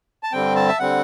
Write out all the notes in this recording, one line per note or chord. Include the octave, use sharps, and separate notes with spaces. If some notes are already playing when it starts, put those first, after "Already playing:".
A5
G2 D3 G3 C4 G5
A5
E5
D3 G3 C4 F#5